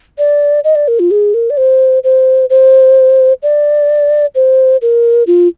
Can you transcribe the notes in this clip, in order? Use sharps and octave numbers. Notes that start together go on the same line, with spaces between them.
D5
D#5
D5
A#4
F4
G#4
A#4
D5
C5
C5
C5
D5
C5
A#4
F4